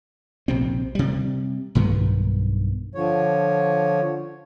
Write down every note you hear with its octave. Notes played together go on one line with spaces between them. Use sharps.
A#1 C3 C4
C3 G3
B1 G2 D#3 B3
D3 F3 C#5